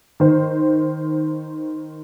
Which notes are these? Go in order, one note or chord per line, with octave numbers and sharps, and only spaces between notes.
D#3 C5